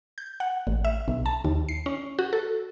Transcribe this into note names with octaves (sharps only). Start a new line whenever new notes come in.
G6
F#5
A1
E5
B1
A5
D#2
C7
C#4
F#4
A4